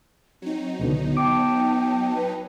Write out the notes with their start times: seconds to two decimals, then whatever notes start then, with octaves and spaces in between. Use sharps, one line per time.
0.42 F#3 C4 D#4
0.79 C#2 B2 D3 B3
1.17 G5 A5 D6
2.14 B4